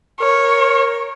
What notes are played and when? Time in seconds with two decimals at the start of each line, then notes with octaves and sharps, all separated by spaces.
0.20 A#4 C#5